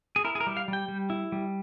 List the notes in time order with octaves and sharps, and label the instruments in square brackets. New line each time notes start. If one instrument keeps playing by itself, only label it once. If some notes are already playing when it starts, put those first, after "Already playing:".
[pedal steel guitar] G#4
E4 A#4
G#4
A#4
G3
F5
G3
G5
G3
E4
G3